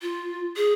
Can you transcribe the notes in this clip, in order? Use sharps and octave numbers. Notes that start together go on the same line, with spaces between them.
F4
G#4